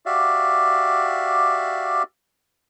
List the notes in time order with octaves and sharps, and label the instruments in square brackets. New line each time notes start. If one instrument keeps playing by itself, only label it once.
[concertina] F#4 G4 D5 E5 F5